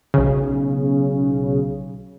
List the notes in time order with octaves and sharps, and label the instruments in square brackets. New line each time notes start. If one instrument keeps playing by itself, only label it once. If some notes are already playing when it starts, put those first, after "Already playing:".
[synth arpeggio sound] B1 C#3